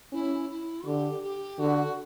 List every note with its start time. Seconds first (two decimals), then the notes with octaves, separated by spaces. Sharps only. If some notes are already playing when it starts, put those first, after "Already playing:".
0.12 C#4 E4
0.49 E4
0.85 D3 G4
1.23 G4
1.59 D3 F#4